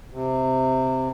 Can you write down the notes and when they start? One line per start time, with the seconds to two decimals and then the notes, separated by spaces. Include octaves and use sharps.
0.11 C3